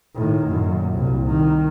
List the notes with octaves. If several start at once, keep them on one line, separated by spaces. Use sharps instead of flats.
A2 D#3
F#2 A#2
C2 A#2
D#3